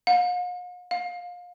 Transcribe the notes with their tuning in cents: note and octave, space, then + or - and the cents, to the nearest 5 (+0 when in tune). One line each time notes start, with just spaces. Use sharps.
F5 +45
F5 +30